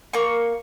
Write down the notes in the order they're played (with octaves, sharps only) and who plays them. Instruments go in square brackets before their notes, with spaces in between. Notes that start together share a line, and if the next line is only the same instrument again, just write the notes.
[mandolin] A#3 C#6